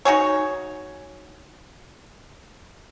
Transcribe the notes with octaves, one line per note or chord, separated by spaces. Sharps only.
D#4 F#4 G#4 C#5